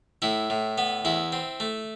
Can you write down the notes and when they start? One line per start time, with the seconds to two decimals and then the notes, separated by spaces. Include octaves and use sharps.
0.22 A2 E4
0.50 A2
0.78 B3
1.05 E2 E4
1.32 C4
1.60 A3